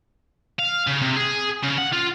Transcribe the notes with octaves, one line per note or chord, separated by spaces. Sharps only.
F5
C#3
C3
G#4
C#3
F#5
F4